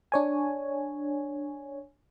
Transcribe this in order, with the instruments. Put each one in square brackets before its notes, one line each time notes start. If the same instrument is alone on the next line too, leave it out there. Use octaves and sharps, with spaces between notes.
[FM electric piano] D4 C#5 G#5